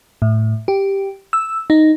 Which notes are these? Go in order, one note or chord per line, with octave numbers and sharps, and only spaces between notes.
A2
G4
E6
D#4